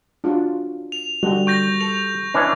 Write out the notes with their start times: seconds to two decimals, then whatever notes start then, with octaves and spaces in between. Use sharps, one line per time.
0.24 D4 F4 F#4
0.92 F7
1.23 D3 G3 F#4 G5
1.47 C#6 G6 A#6
1.81 A4 F7
2.34 E3 C#4 D4